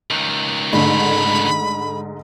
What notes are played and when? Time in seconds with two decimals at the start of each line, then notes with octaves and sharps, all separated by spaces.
0.10 C#2 D#3
0.73 G#2 D3 A3 B5